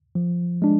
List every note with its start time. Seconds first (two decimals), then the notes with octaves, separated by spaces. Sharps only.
0.15 F3
0.62 G#3 D4